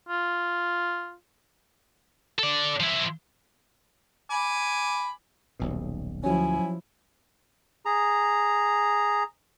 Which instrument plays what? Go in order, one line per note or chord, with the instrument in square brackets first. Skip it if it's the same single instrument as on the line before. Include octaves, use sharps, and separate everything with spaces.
[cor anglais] F4
[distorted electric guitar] A4 D5
F3 E4
[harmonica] G#5 B5 D6
[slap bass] D#1 B1 B2
[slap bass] D2 [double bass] F3 E4 [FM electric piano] F#3 C#4 [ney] G#5
[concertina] G#4 A#5